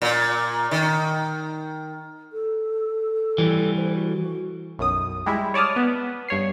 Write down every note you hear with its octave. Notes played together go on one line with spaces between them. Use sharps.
A#2
D#3
A4
E3 G3
C5
F#4
B1 F#2 D#6
G3 G#3 E4
C#5 D5 A5 D#6 F6
B3
G2 C#5 C7